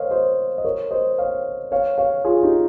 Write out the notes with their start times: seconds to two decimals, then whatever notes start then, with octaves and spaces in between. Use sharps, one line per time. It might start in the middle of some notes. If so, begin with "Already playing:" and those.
Already playing: A#4 C5 C#5 D#5 F5
0.10 C5 D#5
0.58 D#5
0.65 A#4 C#5
0.91 C5 D#5
1.18 C#5 F5
1.72 C#5 F5
1.98 C#5 F5
2.25 F4 G#4
2.43 D#4 G4